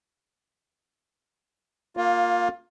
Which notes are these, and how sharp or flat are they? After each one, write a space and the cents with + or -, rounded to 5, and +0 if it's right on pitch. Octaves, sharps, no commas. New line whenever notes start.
A#3 -5 F4 +20